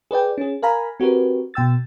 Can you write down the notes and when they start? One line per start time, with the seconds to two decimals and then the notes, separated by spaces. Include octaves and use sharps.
0.11 G#4 B4 D5 G5
0.38 C#4 G#4
0.62 A#4 F5 G#5 A#5 B5
1.00 C4 F#4 G4 A#4 B4
1.54 B2 G5 E6 A6